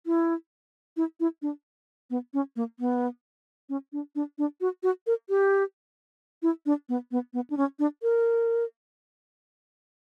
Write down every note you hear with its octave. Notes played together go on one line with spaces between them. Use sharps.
E4
E4
E4
D4
B3
C#4
A#3
B3
C#4
D4
D4
D4
F#4
F#4
A#4
G4
E4
D4
B3
B3
B3
D4
C#4
D4
A#4